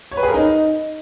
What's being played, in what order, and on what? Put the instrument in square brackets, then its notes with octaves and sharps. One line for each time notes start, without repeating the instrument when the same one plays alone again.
[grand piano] C#5
B4
G#4
A#4
D#4